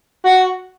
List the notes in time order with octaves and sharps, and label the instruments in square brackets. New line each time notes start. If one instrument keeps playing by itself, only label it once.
[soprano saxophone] F#4